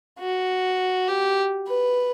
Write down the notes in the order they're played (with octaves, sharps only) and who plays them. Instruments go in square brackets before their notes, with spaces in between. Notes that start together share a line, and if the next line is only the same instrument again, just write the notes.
[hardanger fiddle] F#4
G4
B4